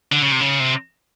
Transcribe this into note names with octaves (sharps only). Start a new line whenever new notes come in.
D3
C#3
C3
C#3
C3